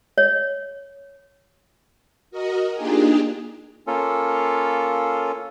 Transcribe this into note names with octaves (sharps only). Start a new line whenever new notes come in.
C#5
F#4 A#4 D#5
A#3 D4 D#4 F4 G4 G#4
A#3 C#4 F4 A4